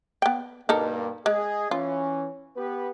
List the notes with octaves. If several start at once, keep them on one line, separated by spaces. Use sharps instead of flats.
B3 G5
G2 B2 A#3 D#4 A4 A#4
G#3 G#4 D#5
E3 C#4 F4
B3 G4 B4